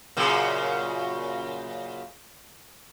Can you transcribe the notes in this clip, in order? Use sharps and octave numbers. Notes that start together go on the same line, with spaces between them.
F#2 A#2 C#3